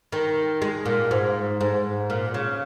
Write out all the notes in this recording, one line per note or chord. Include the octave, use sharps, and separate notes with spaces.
D#3
G#3
A#2
G#2
G#2
A#2
C#3